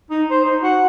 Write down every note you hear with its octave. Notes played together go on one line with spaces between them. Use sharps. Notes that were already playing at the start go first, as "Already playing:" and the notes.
D#4
C5
D#4
F#4